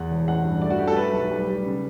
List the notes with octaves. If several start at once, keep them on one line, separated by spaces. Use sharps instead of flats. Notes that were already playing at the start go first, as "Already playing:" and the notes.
Already playing: E2 F#5
E1
A1 F#5
G2
A3 D5
F#4
A3 G4
A4
A3 B4
B1
G3
G3
C#3